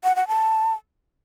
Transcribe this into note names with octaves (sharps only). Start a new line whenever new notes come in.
F#5
F#5
A5